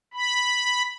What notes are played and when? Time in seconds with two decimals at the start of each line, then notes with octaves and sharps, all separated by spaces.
0.14 B5